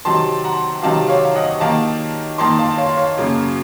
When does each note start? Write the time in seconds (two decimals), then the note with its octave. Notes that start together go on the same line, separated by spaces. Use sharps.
0.05 C3 D#3 F#3 A5 C6
0.44 F#5 A#5
0.82 C3 D#3 F#3 F5 A5
1.09 C#5 F5
1.25 F5
1.36 D#5 F#5
1.60 D#3 A#3 D#4 F5 A5
2.38 D#3 A#3 D#4 A5 C6
2.59 F5 A5
2.77 C#5 F5
2.97 C#5 F5
3.17 F#2 C#3 F#3 A#3